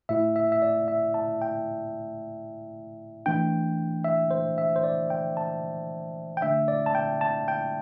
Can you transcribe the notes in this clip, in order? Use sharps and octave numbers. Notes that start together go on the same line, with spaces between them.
A2 A3 E4 E5
E5
E5
D5
E5
A5
G5
E3 A3 D4 G5
E5
C5
E5
C5
D5
G5
A5
G5
D3 A3 D4 E5
D5
A5
G5
A5
G5